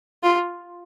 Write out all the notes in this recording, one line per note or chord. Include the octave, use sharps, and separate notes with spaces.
F4